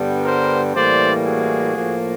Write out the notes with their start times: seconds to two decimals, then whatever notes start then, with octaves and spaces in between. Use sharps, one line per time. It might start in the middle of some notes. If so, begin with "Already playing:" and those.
Already playing: G2 D3 G3 B3
0.23 A#4 C5
0.75 A2 E3 G3 A#3 C5 D5
1.25 F#4 G#4
1.77 A2 F3 A#3